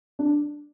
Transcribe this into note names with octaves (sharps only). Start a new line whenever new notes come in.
D4